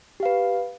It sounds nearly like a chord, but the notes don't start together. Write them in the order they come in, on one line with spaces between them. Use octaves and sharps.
G4 F5 B4